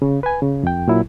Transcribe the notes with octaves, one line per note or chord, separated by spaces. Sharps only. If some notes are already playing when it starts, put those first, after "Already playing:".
C#3
B4 G#5
C#3
F2 G5
A#2 F#3 E4